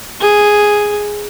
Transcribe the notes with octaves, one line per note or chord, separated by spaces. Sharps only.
G#4